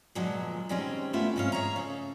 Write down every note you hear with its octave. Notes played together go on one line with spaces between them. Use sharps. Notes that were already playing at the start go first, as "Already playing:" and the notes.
A#2 D3 F3 F#3 G#3 B3
D#3 G3 G#3 C4 C#4
A3 B3 C#4 E4 F4 E5
G#2 C4 C#4 C#5 F5
G#4 C#5 E5 A#5
C#3 A4